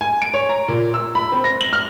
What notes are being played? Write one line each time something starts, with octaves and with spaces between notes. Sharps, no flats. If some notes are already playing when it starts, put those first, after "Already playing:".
G#5
D7
C#5
A#5
A#2
E6
B5
C4
A#6
F#7
F6